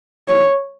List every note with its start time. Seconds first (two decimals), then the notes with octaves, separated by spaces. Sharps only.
0.28 C#5